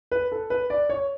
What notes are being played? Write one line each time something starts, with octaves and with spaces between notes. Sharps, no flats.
B4
A4
B4
D5
C#5